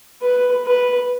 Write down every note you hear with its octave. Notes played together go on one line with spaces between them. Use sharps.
B4
B4